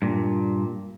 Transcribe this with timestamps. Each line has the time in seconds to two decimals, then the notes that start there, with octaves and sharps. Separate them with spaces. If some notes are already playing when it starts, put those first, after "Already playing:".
0.02 G2 A#2